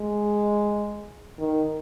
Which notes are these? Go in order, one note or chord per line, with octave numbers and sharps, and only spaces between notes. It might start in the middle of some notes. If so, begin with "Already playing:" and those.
Already playing: G#3
D#3